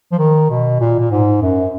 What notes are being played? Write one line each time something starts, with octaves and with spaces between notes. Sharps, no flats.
F3
D#3
B2
A#2
A#2
G#2
F#2